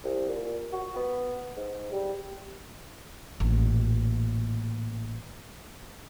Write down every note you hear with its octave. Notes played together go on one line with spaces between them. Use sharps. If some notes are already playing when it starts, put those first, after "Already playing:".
C2
A#2
F#4
B3
G#2
G3
A1 A#2